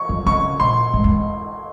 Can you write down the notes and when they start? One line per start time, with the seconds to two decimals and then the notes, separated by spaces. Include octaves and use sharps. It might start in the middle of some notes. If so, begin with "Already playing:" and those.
Already playing: C#6
0.09 F2
0.26 C#3 C#6
0.60 A#2 C6
0.94 G#2
1.04 E2